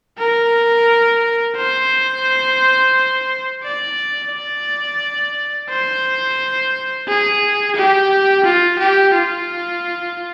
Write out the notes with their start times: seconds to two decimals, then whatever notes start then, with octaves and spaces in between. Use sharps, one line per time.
0.18 A#4
1.56 C5
3.63 D5
4.31 D5
5.69 C5
7.08 G#4
7.76 G4
8.44 F4
8.79 G4
9.14 F4